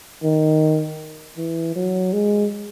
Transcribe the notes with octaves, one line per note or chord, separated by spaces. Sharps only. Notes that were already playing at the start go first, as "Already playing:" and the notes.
D#3
E3
F#3
G#3